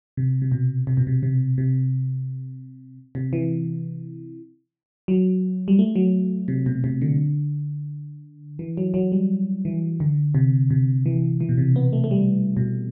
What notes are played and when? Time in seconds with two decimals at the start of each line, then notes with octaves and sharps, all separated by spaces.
0.17 C3
0.42 C3
0.52 B2
0.87 C3
0.97 B2
1.07 C3
1.23 C3
1.58 C3
3.15 C3
3.33 E3
5.08 F#3
5.68 G3
5.79 A3
5.96 F#3
6.48 C3
6.66 B2
6.84 C3
7.02 D3
8.59 E3
8.77 F#3
8.94 F#3
9.12 G3
9.65 E3
10.00 D3
10.35 C3
10.70 C3
11.06 E3
11.40 E3
11.49 B2
11.58 C3
11.76 B3
11.93 A3
12.04 A3
12.11 G3
12.57 B2